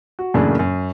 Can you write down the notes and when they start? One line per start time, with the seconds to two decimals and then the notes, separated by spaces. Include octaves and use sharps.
0.19 F#4
0.34 F#2 A2 C#3 E3 A#3 D4
0.59 F#2